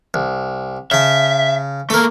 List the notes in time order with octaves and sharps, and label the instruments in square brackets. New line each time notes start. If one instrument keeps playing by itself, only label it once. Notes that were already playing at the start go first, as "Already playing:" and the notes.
[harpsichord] C2
[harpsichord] C#3 A5 [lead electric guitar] E5
[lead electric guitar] A3 A#3 [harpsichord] A4 A#4